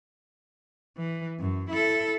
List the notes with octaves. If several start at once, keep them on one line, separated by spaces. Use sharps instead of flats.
E3
F#2
E4 A4